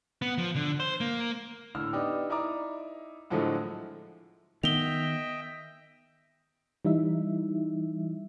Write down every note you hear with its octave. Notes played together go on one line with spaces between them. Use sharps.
B3
F3
D3
C5
A#3
A2 D3 E6 F6
B3 D4 D#4 G4
D#4 E4 D5 A#5 D6
A2 D3 F3 F#3 G#3 A3
D#3 B3 D#5 E5 G5 F7 G7
E3 G3 D#4 E4 E5